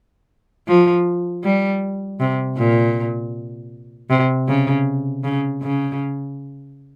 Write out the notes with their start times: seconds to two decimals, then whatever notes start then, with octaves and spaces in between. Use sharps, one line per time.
0.68 F3
1.44 G3
2.20 C3
2.57 A#2
4.10 C3
4.48 C#3
5.24 C#3
5.62 C#3